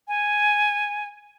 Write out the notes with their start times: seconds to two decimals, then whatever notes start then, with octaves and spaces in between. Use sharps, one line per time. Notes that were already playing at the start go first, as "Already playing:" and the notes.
0.08 G#5